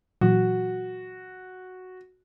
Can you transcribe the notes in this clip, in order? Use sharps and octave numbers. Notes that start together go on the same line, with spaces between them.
A#2 E3 F#3 F#4